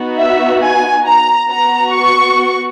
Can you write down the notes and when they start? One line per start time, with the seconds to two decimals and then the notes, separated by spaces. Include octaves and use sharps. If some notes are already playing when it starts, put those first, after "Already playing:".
Already playing: B3 D#4 F#4
0.19 E5
0.63 G#5
1.07 A#5
1.49 B3 F#4 A#5
1.93 C#6